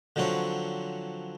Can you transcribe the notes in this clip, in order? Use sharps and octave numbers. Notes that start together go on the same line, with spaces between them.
D3 F3 F#3 C4 C#5